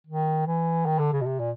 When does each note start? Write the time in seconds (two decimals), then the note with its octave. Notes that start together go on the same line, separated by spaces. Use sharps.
0.07 D#3
0.47 E3
0.86 D#3
0.99 D3
1.12 C#3
1.21 B2
1.26 C3
1.39 A#2